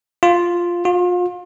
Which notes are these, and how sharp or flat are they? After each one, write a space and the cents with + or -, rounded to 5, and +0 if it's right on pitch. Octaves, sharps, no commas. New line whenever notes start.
F4 +0
F4 +35